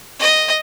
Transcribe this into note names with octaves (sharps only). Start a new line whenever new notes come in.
D#5